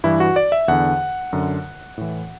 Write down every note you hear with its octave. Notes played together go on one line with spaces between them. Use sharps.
G2 E3 E4
F#4
D5
E5
E2 D3 F#5
F#2 D3
A2 E3